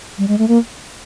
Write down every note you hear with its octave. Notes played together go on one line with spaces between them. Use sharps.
G3
G#3
A3
A#3